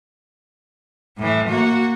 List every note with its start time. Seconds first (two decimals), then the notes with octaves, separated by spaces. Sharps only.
1.18 A2 E3
1.48 A#3 F#4